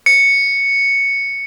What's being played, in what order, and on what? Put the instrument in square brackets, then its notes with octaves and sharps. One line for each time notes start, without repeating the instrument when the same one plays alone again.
[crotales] C#7